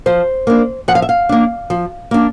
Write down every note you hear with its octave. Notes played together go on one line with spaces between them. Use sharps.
F3 C5
A#3 D4
F3 F#5
F5
E5
F5
A#3 D4
F3
A#3 D4